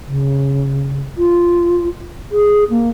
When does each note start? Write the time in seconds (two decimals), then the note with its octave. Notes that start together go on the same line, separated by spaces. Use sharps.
0.06 C#3
1.17 F4
2.32 G#4
2.70 A#3